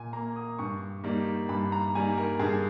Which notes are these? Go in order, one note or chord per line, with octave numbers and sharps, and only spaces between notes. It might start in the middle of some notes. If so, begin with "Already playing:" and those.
Already playing: A#2 G#5
A#3 A#5
D#6
G2 C#6
D#3 G3 A#3
G2 B5
A#5
D#3 G3 A#3 G#5
A#4
G2 G#4